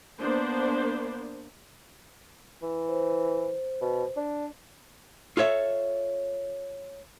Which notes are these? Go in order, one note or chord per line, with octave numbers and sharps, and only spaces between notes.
A#3 B3 D4 C5
E3
C5
B2
D4
F4 A4 C#5 E5